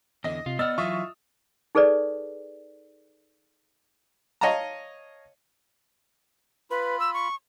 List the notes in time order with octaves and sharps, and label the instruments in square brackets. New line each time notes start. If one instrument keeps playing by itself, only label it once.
[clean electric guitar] E2 D3 [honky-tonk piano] D#5 [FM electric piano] A#6
[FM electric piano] C3 [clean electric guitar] F4
[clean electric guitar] B3 D5 F#5 [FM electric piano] D#5 [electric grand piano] E6 F6 [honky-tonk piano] A6
[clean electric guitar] E3 F#3 [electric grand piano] F4 E5 D#6 [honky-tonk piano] C#6
[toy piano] D#4 G#4 A4 B4 D5
[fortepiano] C#5 D#5 F5 A5 A#5
[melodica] F4 B5 [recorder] B4
[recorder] E6
C#6